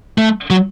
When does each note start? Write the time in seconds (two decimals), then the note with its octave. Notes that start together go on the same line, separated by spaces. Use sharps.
0.18 A3
0.50 F#3